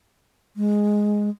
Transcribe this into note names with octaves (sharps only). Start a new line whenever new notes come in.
G#3